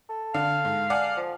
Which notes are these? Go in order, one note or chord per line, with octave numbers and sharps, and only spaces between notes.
A4
D3 F5
G#2
D5 F#5 G#5
F3